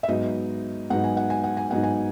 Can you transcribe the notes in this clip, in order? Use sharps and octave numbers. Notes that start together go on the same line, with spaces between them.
E5
G#2 F#3 B3 D#4 D#5
G#2 F#3 B3 D#4 F#5
G#5
F#5
G#5
F#5
G#5
G#2 F#3 B3 D#4 F#5
G#5